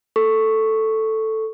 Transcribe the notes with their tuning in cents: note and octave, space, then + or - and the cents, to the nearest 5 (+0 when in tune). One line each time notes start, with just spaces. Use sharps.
A4 +0 C#6 +0